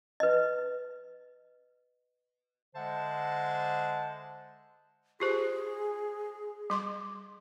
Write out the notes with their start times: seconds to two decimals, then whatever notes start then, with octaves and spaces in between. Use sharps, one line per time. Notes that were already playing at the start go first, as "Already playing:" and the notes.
0.20 B4 D#5
2.75 D3 G#3 C5 E5 F#5 A5
5.20 F4 G4 G#4 C5
6.70 G3 C6 D6